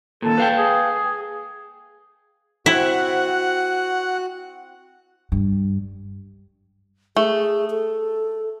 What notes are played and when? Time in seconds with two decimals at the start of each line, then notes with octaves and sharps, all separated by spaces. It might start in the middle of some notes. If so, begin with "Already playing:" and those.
0.22 D#2 A#2 A4
0.38 B4 F5 G5
0.57 G#4
2.66 C4 E4 F#4 F#5 F#6
5.32 G2
7.17 A3 G#4
7.70 A4